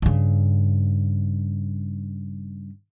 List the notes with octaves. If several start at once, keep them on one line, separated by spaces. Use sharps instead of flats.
G2 C#3